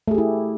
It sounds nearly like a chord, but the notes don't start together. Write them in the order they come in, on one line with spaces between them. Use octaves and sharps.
A3 G#4 G4 E4